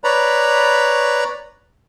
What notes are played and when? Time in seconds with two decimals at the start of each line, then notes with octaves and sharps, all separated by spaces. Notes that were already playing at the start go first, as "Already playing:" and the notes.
0.04 B4 C#5 D5 A#5 B5